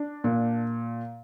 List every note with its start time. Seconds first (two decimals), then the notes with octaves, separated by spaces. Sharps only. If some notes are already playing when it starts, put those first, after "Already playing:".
Already playing: D4
0.24 A#2